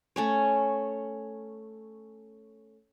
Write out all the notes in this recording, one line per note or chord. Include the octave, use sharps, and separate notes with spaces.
A3 C#4 C#5